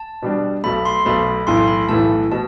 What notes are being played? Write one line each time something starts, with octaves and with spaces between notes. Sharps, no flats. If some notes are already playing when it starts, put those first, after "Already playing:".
Already playing: A5
B2 G3 D4
B1 B2 A3 B5
C6
B1 B2 A3 B5
B1 A2 E3 A3 C6
B5
B1 A2 E3 A3 A5
B2 A5